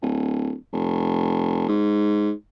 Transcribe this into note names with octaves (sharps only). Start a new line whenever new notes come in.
D1
F1
G#2